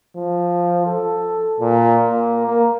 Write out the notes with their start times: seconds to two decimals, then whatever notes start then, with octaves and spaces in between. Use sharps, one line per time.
0.16 F3
0.86 A4
1.60 A#2
2.02 A#3
2.46 A#3